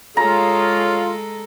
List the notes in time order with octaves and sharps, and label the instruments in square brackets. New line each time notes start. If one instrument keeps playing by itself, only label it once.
[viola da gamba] G#3 A4 [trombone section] F4 [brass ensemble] G#4 C#5 [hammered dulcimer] A#5